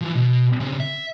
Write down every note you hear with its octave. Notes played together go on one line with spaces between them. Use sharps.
E3 F3
B2
C#3 C4
E5